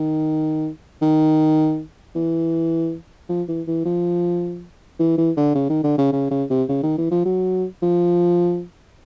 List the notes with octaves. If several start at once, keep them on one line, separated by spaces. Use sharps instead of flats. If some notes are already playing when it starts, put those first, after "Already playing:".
Already playing: D#3
D#3
E3
F3
E3
E3
F3
E3
E3
D3
C#3
D#3
D3
C#3
C#3
C#3
C3
C#3
D#3
E3
F3
F#3
F3